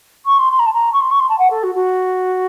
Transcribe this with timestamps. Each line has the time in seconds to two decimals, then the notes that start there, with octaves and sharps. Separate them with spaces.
0.26 C#6
0.38 C6
0.51 C6
0.59 A#5
0.66 A5
0.73 A#5
0.93 C#6
1.00 C6
1.10 C#6
1.20 C6
1.29 A5
1.38 F#5
1.50 A4
1.63 F#4
1.75 F#4